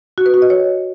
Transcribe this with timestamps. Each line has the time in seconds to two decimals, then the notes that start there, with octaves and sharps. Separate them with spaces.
0.18 F#4
0.26 B4
0.34 F#4
0.42 D#5
0.50 C#5